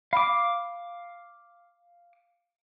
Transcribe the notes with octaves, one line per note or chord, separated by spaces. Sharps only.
F5 B5 D6